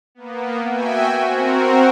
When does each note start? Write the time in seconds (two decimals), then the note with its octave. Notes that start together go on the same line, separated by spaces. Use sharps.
0.15 A#3 B3
0.68 F#4 E5 G5 G#5
1.18 C4 F#4 A#4